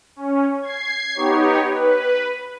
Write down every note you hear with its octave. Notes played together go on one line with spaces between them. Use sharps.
C#4
G#6 C7
B3 D#4 G4 C#5
B4